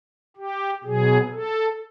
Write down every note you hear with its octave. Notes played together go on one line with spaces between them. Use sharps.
G4
B2 F#3 G#4
A4